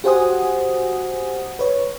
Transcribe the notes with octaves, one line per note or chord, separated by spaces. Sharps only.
F#4 G4 C5 F#5 G#5 D#6
B4 C#5